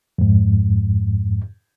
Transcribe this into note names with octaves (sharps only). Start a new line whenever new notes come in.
F2 G#2